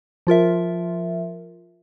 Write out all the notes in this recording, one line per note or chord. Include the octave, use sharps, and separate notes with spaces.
F3 F4 A#4 E5